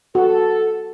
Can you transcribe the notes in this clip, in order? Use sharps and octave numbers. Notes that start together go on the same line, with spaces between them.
F#4 A4